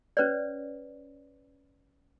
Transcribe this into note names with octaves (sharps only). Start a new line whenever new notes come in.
C#4 B4 C#5 D5